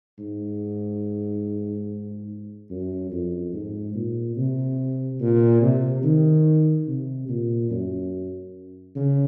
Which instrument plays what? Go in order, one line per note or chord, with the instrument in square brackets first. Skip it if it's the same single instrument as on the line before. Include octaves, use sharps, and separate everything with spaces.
[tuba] G#2
F#2
F2
G#2
A#2
C3
A#2
C3
D#3
C3
A#2
F#2
C#3